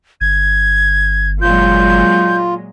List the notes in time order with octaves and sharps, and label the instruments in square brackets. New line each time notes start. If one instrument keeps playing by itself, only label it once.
[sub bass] G1 [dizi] G#6
[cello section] A#2 F#3 G#3 [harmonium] F4 [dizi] G6